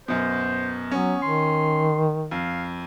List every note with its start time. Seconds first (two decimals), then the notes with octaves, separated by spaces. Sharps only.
0.08 F#2 B2 C5
0.91 F#3 B3 C#4
1.22 D#3 C6
2.31 F2 F5